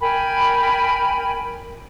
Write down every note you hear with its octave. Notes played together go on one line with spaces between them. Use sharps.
A#4 G5 G#5 B5